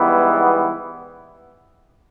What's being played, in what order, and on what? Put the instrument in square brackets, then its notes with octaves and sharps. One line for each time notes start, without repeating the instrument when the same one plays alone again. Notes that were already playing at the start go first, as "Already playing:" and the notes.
Already playing: [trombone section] G#2 E3 G3 B3